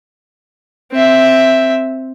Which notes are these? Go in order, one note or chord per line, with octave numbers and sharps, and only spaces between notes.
C4 E5